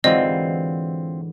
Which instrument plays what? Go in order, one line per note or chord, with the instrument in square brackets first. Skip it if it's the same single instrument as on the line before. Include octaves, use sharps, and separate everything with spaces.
[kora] G#2 D3 F#3 [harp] E3 E4 [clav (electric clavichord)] C4 F4 [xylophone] D#5